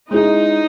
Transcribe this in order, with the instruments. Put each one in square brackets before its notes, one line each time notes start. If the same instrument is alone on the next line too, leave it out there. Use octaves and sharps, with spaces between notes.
[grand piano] G#3 C#4 E4 G#4 [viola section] D#4